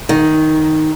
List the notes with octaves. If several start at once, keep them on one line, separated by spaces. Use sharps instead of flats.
D#3